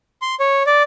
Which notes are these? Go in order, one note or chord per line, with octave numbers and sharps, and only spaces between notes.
C6
C#5
D5